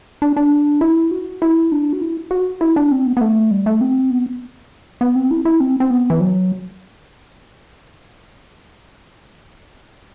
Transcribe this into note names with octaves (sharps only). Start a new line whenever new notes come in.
D4
D4
E4
F#4
E4
D4
F#4
E4
F#4
E4
D4
C4
B3
B3
A3
G3
A3
C4
B3
B3
C4
E4
E4
C4
C4
B3
E3
F#3